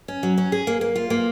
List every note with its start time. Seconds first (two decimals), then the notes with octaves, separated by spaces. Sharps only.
0.08 C#4
0.23 F#3
0.38 C#4
0.52 G#4
0.67 A#3
0.81 A#3
0.96 F4
1.10 A#3